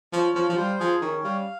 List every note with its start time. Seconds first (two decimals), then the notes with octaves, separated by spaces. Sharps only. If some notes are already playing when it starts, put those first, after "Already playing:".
0.13 F3 C#4
0.35 F3 F5
0.49 F3
0.57 G3 C5
0.79 F3 G#4
1.02 D#3 C#4
1.24 G3 F5